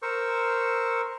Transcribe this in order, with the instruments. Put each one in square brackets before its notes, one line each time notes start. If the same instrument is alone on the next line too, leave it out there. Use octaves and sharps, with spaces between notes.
[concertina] A#4 C5 C#6 E6